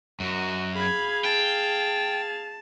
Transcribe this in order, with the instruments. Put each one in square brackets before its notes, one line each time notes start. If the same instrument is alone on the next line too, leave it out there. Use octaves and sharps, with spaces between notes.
[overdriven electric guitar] F#2 [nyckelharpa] F#4 D#5
[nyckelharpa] G#4 F5 [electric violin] B5 G#6
[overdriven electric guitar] G5 [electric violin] A5